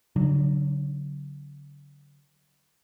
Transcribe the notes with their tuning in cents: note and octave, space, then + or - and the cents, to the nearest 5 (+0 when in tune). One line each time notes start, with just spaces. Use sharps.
D3 -35 F#3 +5 D4 +35